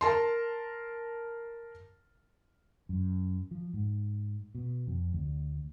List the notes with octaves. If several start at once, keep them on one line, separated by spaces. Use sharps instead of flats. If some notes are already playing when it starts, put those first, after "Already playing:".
A#4 A5 C6
F#2
F3
G#2
B2
F2
D2